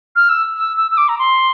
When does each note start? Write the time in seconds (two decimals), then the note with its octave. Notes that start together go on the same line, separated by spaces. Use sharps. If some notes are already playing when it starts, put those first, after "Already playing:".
0.15 F6
0.29 E6
0.56 E6
0.77 E6
0.91 E6
0.97 D6
1.08 A#5
1.19 C6